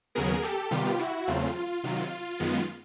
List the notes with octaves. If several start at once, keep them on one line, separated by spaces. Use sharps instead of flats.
D#2 C#3 F#3 B3 G#4 A#4
G4 A4
C3 D#3 G3 B3 F4 G4
E4 F#4
E2 C#3 F#3 A3 C4 F4
F4
C3 D#3 F#3 F4
F#2 D#3 G#3 B3